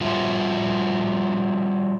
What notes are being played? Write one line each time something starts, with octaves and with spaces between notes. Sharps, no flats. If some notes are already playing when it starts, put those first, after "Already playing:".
G3 F4 F#4 E5